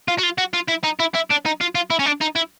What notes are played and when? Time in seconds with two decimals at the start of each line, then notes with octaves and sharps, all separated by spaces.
0.08 F4
0.18 F#4
0.23 F4
0.38 F#4
0.54 F4
0.69 E4
0.84 D#4
0.99 E4
1.14 E4
1.30 D4
1.45 D#4
1.61 F4
1.75 F4
1.90 E4
1.99 C#4
2.06 D4
2.21 D#4
2.36 E4